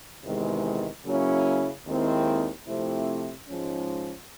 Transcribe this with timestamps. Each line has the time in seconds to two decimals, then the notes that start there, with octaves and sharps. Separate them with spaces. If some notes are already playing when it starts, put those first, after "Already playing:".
0.24 E2 C3 D#3 G#3
1.05 C#3 F#3 A#3 C#4 E4
1.86 D#2 D#3 G#3 C4 E4
2.68 C3 F3 A3 C4 E4
3.49 G#2 F3 G#3 C#4